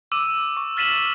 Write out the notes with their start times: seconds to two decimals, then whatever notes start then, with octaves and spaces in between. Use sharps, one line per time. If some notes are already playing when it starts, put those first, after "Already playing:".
0.12 D6 E6 D#7
0.57 C#6
0.77 F6 A6 B6 D#7 E7 F#7